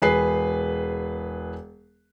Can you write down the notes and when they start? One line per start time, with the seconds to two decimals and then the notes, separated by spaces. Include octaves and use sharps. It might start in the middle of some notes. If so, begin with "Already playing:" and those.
0.02 E1 G#4 B4 C7